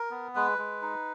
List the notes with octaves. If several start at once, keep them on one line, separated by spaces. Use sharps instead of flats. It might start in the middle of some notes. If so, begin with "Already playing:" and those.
Already playing: A#4
B3
G#3 B4
G#3
D#4